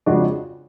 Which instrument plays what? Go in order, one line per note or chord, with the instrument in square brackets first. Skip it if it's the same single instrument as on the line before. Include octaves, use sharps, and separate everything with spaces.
[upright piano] F2 C#3 G#3 D4 F#4